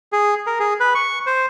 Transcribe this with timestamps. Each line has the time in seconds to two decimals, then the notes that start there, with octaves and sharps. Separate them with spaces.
0.13 G#4
0.47 A#4
0.60 G#4
0.80 B4
0.95 C#6
1.26 C5